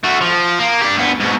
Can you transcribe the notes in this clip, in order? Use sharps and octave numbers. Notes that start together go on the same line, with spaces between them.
A3 F#4
F3
A#3
D4 G4
D2 B3
G#2 B2